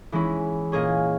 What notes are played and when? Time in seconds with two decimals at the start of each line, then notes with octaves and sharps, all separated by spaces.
0.12 E3 G#3 C#4 E4
0.72 A#2 A#3 C#4 G#4 D#5